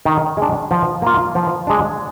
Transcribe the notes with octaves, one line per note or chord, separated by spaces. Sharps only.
D#3
G#3 D4
F3
A#3 F4
F3
G#3 D4